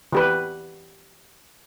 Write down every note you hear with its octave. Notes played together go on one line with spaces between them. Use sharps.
E3 G4 B4